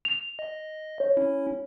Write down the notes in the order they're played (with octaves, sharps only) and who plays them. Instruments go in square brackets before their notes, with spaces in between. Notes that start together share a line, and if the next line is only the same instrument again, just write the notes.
[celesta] F7
[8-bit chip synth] D#5
[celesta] C#5
[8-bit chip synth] C#4 E4